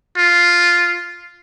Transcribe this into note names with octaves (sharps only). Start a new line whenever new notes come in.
F4